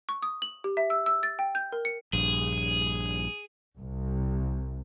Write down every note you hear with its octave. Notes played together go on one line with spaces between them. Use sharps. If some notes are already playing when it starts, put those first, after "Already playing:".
C#6
D#6
F#7
G4
E5
E6
E6
A6
G5
G6
A#4
C#7
A#1 G2 G#4
C2